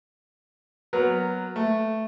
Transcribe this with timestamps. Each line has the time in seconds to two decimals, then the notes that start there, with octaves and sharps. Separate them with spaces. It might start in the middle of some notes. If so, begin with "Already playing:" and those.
0.93 F#3 B3 A#4 B4
1.56 A3